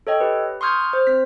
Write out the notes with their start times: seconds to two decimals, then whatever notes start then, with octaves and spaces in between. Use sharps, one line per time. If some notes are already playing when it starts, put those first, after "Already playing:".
0.07 A4 C#5 D#5 G5
0.20 G4 B4
0.61 C6 C#6 D#6 F6 G6 G#6
0.80 F6
0.93 C5
1.07 C4 B6